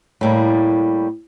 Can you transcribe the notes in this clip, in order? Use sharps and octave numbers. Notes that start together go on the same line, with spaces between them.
A2 G3 A#3